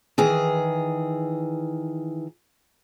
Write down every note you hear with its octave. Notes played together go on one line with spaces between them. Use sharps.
D#3 E3 G#4